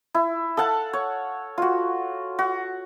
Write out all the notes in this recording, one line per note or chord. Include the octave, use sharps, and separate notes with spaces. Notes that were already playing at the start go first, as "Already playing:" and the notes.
E4
A4 F5 F#5 A5
C#5
F4 F#4
F#4